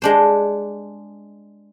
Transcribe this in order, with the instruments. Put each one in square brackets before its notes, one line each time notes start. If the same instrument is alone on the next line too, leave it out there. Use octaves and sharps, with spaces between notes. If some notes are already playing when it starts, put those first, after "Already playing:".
[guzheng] G#3 D4 C5